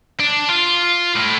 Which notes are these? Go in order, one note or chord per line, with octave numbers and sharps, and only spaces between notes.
D4
F4
A2